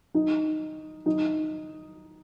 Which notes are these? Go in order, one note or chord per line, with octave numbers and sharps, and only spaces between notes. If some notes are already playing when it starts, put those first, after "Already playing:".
D#4
D#4